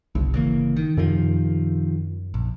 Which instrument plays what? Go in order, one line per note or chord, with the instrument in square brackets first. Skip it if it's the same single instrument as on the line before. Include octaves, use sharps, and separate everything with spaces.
[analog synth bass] G1 [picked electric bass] C2
[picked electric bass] C#3 E3 A#3
D#3
[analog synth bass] F#2 [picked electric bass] C3 D#3 F3
[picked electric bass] A#1